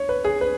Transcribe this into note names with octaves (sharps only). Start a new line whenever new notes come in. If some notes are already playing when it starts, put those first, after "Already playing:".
Already playing: C#5
B4
G#4
B4